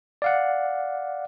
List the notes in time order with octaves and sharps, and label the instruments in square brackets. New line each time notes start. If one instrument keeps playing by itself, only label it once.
[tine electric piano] D5 F5 F#5